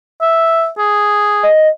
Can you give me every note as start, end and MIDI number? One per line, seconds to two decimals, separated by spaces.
0.21 0.68 76
0.78 1.47 68
1.44 1.69 75